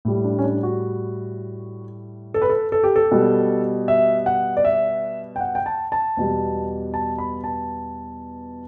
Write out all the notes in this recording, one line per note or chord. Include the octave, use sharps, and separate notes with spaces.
A2 G3
D4
C#4
D4
F#4
A4
B4
A4
A4
G4
A4
B2 G3
E5
F#5
D5
E5
G5
F#5
G5
A5
A5
E2 B2 G3
A5
B5
A5